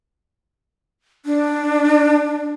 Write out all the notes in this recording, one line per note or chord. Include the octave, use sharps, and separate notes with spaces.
D4